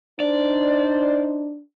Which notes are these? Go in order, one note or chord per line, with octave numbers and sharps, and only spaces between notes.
D4 D#4 C5 D5